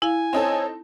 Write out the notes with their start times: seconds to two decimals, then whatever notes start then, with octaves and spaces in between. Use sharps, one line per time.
0.02 E4 F5 G#5
0.33 C4 D#4 A4 C#5